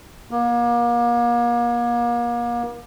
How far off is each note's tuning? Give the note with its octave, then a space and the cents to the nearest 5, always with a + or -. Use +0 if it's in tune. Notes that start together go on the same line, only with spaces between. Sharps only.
A#3 +35